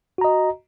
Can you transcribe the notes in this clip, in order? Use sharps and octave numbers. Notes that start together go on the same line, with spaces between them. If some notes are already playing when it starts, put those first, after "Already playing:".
F#4 D#5 A#5